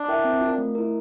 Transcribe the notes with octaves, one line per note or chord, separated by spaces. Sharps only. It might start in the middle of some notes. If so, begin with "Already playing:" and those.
Already playing: D4
E4 A#4 E5 G5
C4
F4 A#4
A3
E4 A#4